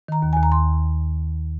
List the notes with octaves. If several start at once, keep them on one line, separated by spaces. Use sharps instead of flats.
D#3 A#5
D#2
D#2 G#5
A#5
D#2 C6